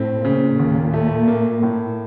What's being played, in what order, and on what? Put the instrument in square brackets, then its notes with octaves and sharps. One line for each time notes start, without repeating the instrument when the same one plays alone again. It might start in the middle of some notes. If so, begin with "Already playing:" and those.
Already playing: [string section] A2 [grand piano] C4
[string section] A#2 [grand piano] C#3
[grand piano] D#2
A3
A#3
A2